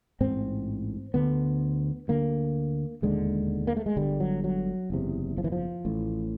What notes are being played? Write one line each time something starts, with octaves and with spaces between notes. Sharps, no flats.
A1 G#2 C4
D2 D3 B3
D2 D3 A#3
E1 D#2 D3 G#3
A#3
A3
G#3
G1 G2 D3 G3
F#3
F#3
F#1 E2 C3
F3
E3
F3
A1 A2